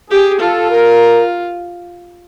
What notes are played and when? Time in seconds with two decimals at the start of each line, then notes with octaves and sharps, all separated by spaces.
0.10 G4 G#4
0.40 F4 A4
0.70 A#4